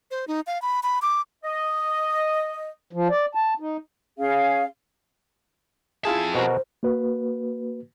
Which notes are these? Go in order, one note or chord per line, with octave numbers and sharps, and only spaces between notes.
C5
D#4
F5
B5
B5
D6
D#5
F3
D5
A5
D#4
C#4 G#4 F5
F2 E4 F4 G#4 A5
B2 F#4 A#4 C5
A#3 F#4 B4